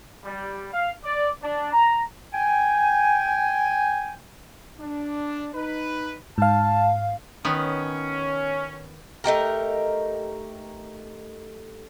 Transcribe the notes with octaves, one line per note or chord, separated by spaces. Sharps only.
G3
F5
D5
D4
A#5
G5 G#5
D4
D#4 B4
G#2 F5 A5
D#3 B3 C#4
A3 D#4 G4 A#4